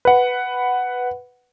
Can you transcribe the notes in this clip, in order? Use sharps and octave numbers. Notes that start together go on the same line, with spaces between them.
B4 F#5